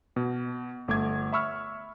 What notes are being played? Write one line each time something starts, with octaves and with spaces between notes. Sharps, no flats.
B2
G1 A3 D6 G#6
E5 B5 C#6 E6 F6